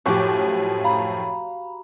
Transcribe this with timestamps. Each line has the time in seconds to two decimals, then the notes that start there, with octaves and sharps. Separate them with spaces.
0.06 F#2 A2 F3 F#4 G4
0.84 F5 A#5 B5